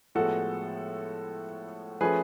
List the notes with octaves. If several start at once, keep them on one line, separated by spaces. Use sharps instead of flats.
A2 F3 G#3 B3 F#4 A4
F3 A3 C#4 G#4 B4